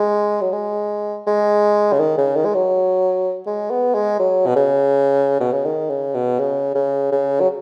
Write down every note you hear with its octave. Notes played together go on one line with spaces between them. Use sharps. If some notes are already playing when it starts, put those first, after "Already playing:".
Already playing: G#3
F#3
G#3
G#3
C#3
D#3
C#3
D#3
G#3
F#3
G#3
B3
G#3
F#3
B2
C#3
B2
C#3
D#3
C#3
B2
C#3
C#3
C#3
F#3